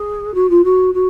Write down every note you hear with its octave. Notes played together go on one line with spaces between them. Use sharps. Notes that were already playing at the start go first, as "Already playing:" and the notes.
Already playing: G#4
F#4
F4
F#4
F#4